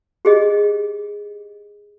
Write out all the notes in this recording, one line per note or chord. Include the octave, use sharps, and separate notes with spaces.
G4 G#4 D#5